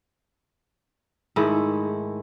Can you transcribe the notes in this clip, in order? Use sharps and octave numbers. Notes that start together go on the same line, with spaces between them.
G#2 D#3 A3 E4